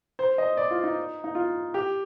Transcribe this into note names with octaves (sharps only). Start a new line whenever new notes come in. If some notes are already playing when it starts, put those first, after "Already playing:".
C5
D#5
D5
F4
D#4
D#4
F4
G4